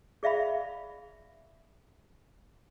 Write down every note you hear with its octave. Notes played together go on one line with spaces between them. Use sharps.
G#4 D5 E5 F5 B5